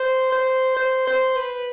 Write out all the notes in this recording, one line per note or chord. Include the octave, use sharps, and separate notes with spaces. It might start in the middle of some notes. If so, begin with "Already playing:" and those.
Already playing: C5
C5
C5
C5
B4